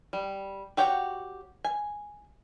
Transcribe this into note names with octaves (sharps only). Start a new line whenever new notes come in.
G3
F#4 G4 C#5 F#5 G5
G#5